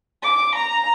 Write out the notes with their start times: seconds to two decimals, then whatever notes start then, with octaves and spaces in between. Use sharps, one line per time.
0.22 D6
0.54 A#5